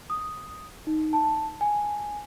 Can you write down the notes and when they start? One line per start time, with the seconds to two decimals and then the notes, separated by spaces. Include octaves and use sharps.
0.10 D#6
0.87 D#4
1.13 A5
1.61 G#5